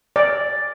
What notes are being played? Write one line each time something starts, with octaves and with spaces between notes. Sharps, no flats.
D5